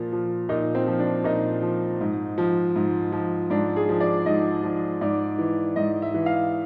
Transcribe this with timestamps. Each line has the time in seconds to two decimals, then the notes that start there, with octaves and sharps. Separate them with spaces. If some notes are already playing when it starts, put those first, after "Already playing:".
Already playing: A#2 F3
0.12 F3
0.49 A#2 D#4
0.75 C4
0.87 F3
0.99 D4
1.24 A#2 D#4
1.62 F3
2.01 G#2
2.38 F3
2.76 G#2
3.12 F3
3.50 G#2 D4
3.76 G#4
3.89 F3
4.01 D5
4.26 G#2 D#5
4.64 F3
5.01 G#2 D5
5.38 E3
5.76 G#2 D#5
6.02 E5
6.14 E3
6.26 F5